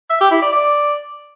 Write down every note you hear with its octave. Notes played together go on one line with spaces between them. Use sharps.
E5
G4
E4
D5
D5